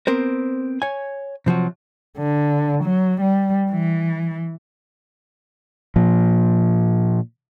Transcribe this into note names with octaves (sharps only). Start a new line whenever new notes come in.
B3 C4 A#4 C5
C#5 G#5
C3 F3 F#3 F#4
D3
F#3
G3
E3
A#2 F3